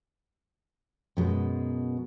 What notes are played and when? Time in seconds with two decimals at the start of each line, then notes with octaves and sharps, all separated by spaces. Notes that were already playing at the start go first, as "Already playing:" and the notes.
1.17 F#2 B2 G#3